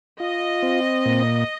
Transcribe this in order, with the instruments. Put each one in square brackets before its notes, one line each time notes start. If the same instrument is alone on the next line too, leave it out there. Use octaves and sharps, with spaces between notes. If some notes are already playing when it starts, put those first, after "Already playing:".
[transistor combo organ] F4 [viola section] D#5
[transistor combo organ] C4
A#2